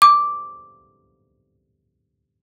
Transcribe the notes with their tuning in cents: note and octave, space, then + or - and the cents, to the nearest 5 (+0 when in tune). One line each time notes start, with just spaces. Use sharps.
D6 -5